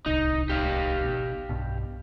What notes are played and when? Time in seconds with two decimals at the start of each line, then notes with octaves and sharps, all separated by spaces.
0.06 D1 C2 D#4
0.49 G4 F5
1.04 G#1 B2
1.49 B1 G2 B2